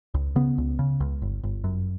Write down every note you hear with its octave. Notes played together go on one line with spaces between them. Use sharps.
C#2
C#3 B3
C#2
C#3
C#2
G1
G1
F#2